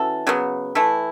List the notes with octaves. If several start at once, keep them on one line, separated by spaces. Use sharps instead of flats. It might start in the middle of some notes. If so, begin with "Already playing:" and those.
Already playing: E3 C#4 F#4 A4
C#3 F#3 B3
E3 A3 E4